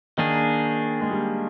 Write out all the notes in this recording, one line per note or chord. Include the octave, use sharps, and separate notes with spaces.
D#3 A#3 D4 G#4
G#3
G3